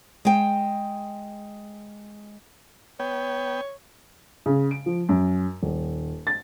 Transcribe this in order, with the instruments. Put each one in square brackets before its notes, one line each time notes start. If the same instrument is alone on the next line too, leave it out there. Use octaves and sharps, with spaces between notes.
[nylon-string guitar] G#3 G5
[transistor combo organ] B3 G5 [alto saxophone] C#5
[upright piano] C#3
D7
F3
F#2
D#1
A6